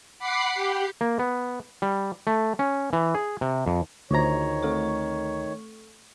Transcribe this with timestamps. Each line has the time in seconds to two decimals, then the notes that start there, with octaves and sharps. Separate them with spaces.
0.19 F#5 B5 D6 C7
0.55 G4
1.01 A#3
1.19 B3
1.82 G3
2.27 A3
2.59 C#4
2.93 E3
3.15 G#4
3.41 C3
3.66 F2
4.11 D2 D#3 F4 F#4 C5 C#5 A#5
4.63 A3 A4 C#6